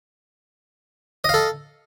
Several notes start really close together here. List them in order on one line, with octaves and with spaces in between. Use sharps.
D#5 F5 A4